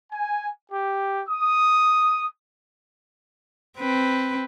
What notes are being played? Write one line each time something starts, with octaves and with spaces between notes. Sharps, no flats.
G#5
G4
D#6
C4 B4